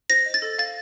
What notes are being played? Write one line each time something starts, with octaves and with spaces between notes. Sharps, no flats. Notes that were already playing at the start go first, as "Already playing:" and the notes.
C5 A#6
D#5
A6
A4
F5 A6